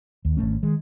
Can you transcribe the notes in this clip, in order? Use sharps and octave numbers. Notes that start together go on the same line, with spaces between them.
D#2
G#1 A2 A3 C#4
D#3 G#3